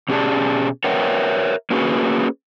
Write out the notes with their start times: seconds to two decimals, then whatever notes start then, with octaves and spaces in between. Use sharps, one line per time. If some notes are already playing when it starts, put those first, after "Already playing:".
0.09 B2 C#4 G4 G#4 D5 A5
0.84 A#4 B4 C#5 E5 F#5 G5
1.70 A#3 C#4 F#4 G#4 B4